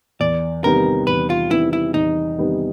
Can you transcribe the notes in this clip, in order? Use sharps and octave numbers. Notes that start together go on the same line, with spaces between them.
E2 D5
C3 D#3 G3 B3 A#4
E2 B4
F4
C3 D#3 G3 B3 E4
E4
E2 D#4
C3 D#3 G3 B3